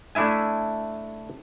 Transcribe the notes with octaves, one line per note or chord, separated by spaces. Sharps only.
A3 D4 E4 E5 G#5